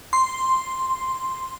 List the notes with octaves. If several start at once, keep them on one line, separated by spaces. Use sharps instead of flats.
C6